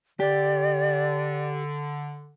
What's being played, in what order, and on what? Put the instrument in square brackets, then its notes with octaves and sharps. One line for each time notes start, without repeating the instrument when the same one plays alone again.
[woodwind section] D3 [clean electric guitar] G4 [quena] D5